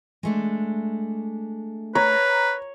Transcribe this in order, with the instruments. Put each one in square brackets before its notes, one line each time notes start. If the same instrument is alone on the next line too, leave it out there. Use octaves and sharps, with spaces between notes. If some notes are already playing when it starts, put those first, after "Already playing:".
[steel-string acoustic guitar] G#3 A3 D4
[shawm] B4 [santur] C#5 [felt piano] A#5